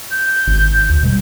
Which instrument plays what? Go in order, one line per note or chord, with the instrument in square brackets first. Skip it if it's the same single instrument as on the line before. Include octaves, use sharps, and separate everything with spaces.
[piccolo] G6
[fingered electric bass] G#1
D2
B2 G3